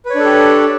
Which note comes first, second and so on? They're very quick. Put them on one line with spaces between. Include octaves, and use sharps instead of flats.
B4 C#5 D4 A4 G4